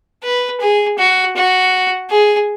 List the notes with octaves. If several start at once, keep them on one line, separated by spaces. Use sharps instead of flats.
B4
G#4
F#4
F#4
G#4